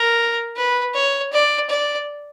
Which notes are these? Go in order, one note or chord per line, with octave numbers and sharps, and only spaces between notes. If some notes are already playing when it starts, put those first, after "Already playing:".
Already playing: A#4
B4
C#5
D5
D5